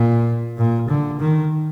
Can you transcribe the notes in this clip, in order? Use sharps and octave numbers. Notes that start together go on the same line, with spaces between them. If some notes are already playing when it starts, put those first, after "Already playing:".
Already playing: A#2
A#2
D3
D#3